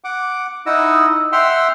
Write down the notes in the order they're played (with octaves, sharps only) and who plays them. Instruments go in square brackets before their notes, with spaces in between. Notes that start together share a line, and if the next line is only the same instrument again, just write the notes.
[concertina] F#5 D6
D#4 E4 D#5 F#5 E6
E5 F#5 G5 C6 E6 F6